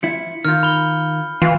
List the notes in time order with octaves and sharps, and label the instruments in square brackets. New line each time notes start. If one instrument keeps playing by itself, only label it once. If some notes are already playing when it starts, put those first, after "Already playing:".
[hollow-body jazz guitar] F3 E4 [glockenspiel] C#7
[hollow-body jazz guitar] D#3 F4 [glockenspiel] F6 G6
[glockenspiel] B5 G7
[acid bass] E3 [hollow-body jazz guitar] F4